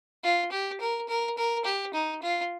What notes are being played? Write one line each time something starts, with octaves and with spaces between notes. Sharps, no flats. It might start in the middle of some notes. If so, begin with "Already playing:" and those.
F4
G4
A#4
A#4
A#4
G4
D#4
F4